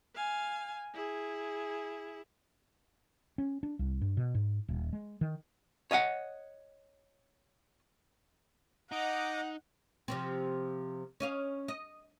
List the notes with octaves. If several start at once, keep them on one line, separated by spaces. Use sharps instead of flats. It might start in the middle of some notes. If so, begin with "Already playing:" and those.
F5 G#5
E4 G#4
C#4
D4
C2
G2
B2
G#2
D#1
G#3
D#3
C#5 D#5 F5 F#5
D#4 D#5 F#5 A#5 D6
C3 F3 C4
C#4 D#5 F5
D#5